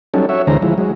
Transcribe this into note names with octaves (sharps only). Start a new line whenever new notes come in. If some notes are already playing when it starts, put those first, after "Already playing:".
F#3 G3 C#4 D#4 A4
F#4 C#5 E5
D2 D3 E3 G#3 C5 A#5
F3 G#3 E4
F#3 G#3